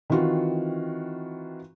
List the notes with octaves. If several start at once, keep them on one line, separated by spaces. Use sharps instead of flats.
D#3 E3 C4 F4 F#4